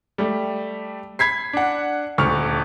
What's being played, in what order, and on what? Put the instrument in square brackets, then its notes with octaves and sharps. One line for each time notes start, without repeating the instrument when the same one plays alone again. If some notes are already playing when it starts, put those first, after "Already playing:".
[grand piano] G3 A3
B5 G#6 B6 C7
D4 F#5
D#1 D2 C#6 F6